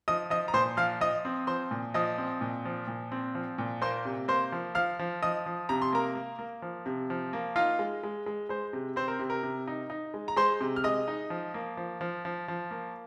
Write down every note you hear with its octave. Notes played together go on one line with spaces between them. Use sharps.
F3 D#5 D#6
F3 D#5 D#6
A#5
A#2 C5 C6
F3 F5 F6
F3 D#5 D#6
C4
F3 C5 C6
A#2
F3 D#5 D#6
C4
A#2
F3
A#2
C4
F3
A#2
A#3 C5 C6
C3
A#3 C5 C6
F3
F3 F5 F6
F3
F3 D#5 D#6
F3
C3 A#5
C6
A#3 A#4 A#5
A#3
A#3
F3
C3
F3
A#3
D#4 F4 F5
G#3
G#3
G#3
G#3 C5
C3
C4 C5
A#4
C3
A#4
C3
D#4
D#4
G#3
A#5
G#3 C5 C6
C3
F6
G#3 D#5 D#6
D#4
F3
A#3
F3
F3
F3
F3
A#3